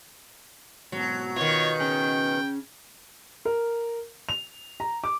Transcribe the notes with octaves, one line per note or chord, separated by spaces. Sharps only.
G#2 B2 F#3
B2 D#3 F4 C#5
C#4 G#4 G5
A#4
F7
A#5
D6